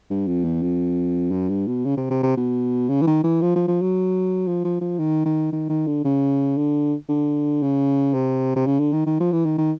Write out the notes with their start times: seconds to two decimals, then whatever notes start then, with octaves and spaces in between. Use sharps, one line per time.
0.10 G2
0.27 F2
0.44 E2
0.62 F2
1.31 F#2
1.49 G2
1.67 B2
1.85 C#3
1.97 C3
2.10 C3
2.23 C3
2.37 B2
2.89 C#3
3.01 E3
3.07 D#3
3.24 E3
3.41 F3
3.55 F3
3.67 F3
3.81 F#3
4.47 F3
4.64 F3
4.81 F3
4.99 D#3
5.25 D#3
5.52 D#3
5.69 D#3
5.87 D3
6.04 C#3
6.57 D3
7.09 D3
7.62 C#3
8.14 C3
8.56 C3
8.66 C#3
8.79 D3
8.92 D#3
9.06 D#3
9.20 F3
9.32 E3
9.45 D#3
9.58 D#3